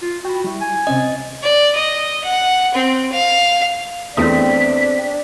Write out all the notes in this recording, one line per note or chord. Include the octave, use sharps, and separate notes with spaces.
F4
F#4 G5 B5
G3 E4
G#5
C3 C4 C#4 D#5
D5
D#5
F#5
C4
F5
E2 A3 C4 D4 D#6 B6